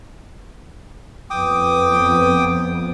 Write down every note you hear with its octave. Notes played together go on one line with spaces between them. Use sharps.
F2 B3 G5 D6 D#6